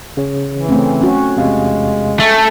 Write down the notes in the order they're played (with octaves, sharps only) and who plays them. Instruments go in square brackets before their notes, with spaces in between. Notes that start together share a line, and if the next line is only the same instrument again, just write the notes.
[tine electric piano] C#3 C#5
[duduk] E3
[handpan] A3 C4 C#4
C#4 F#4
[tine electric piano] E2 C3 F5 [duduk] G#3
[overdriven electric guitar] A3 [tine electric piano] G#5